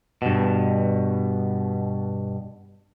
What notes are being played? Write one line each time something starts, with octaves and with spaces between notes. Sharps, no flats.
G2 B2